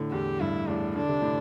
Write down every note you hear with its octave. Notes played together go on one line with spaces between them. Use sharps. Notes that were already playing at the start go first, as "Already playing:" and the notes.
Already playing: A2 D3
E2 G4
G2 E4
E2 A2 D4
D3 D4
C3
A2 D3